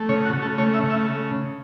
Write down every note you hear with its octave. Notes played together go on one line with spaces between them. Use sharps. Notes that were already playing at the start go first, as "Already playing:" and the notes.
Already playing: A3
C#3 C#5
F#4
C#3
A4
A3 C#5
E5
C#3
E5